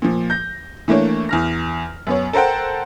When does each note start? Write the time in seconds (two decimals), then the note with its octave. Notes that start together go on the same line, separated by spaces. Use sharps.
0.02 A#2 F3
0.30 G6 A#6
0.88 E3 A3 A#3 D4 C#5
1.29 E2 F6 A#6
2.07 F#2 B3 C#5
2.33 A4 A#4 C5 F#5 G5